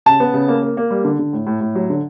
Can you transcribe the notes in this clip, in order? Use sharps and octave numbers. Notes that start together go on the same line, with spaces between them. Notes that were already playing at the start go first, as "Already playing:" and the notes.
C#3 A5
B3
C#3
A#3
A#3
A#3
G3
D3
D3
A2
A2
A2
F#3
D3